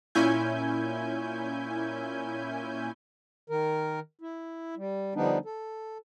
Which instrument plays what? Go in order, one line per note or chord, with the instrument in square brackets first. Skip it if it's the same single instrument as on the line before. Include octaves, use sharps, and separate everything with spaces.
[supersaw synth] A#2 C#4 E4 G#5 G6
[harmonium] D#3 A#4
E4
G3
D3 F3 G3 B3 D4 D#4
A4